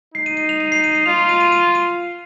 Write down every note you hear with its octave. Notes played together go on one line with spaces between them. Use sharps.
D#4 C7
D#7
D#7
F7
D#7
C7
D#7
D#7
F4 F7
D#7
D#7
D#7
D#7
D#7